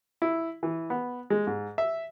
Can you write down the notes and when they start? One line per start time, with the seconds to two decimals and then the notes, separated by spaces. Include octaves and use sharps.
0.22 E4
0.63 E3
0.90 B3
1.30 G#3
1.47 G#2
1.78 E5